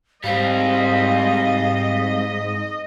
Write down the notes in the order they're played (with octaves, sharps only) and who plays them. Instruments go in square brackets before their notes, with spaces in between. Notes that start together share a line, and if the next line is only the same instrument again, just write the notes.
[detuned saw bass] G#2 [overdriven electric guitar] G3 C4 [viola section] D#5 [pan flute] F5